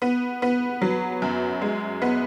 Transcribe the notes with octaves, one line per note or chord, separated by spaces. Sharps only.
B3
B3
F#3
F#2
G#3
B3